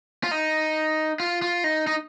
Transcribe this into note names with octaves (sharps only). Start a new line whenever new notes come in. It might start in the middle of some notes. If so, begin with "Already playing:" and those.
F4
D#4
F4
F4
D#4
D#4